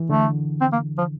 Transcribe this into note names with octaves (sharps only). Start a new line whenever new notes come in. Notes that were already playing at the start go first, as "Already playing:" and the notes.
Already playing: E3
D3 A3
C4
A#3
F3